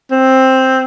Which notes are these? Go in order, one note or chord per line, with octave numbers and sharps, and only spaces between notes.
C4